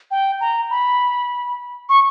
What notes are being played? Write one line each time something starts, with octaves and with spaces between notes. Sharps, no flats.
G5
A#5
B5
C#6